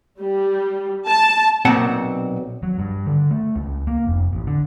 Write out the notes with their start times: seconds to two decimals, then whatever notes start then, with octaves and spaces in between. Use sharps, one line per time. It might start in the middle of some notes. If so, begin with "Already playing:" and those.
0.20 G3
1.07 A5
1.65 B1 A#2 C4 F#5 A5
2.63 F#3
2.79 G2
3.06 D3
3.31 A3
3.56 C#2
3.87 A#3
4.07 F1
4.33 A1
4.47 D3